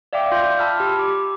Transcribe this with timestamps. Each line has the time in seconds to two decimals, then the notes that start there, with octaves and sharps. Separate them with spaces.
0.13 D5 E5 F5 G5 D6
0.32 F4 C6 G6
0.59 A5 B5 E6 F6
0.80 G4
0.99 D6